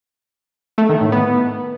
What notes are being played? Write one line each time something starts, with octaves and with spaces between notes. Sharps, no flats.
A3
D#3
A2
B3